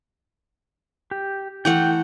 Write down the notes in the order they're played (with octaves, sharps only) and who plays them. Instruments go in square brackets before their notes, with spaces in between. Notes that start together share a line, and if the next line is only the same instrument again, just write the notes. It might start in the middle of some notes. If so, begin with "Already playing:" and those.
[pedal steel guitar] G4
[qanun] E3 A3 F#5 [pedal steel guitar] G5